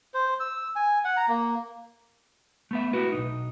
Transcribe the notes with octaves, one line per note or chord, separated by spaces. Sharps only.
C5
E6
G#5
F#5
A#5
A#3
A3 B3 E5
A3 E4 F#4 B4
B1 G#2 D#4